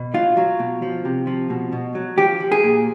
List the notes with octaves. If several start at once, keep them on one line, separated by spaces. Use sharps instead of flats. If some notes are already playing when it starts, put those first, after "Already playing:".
Already playing: B2
F#3 F4
F#3
B2
F3
C3
F3
B2
B2
F#3
F3 G4
F3
G#4
A#2